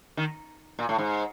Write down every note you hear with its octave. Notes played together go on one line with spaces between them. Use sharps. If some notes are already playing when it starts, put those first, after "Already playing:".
D#3
A#2
A2
G#2